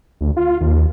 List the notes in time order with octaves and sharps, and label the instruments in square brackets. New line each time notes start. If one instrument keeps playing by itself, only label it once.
[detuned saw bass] D2
F4
D#2